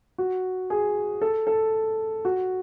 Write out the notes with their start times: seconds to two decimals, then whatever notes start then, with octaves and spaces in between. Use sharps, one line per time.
0.18 F#4
0.70 G#4
1.22 A4
1.47 A4
2.25 F#4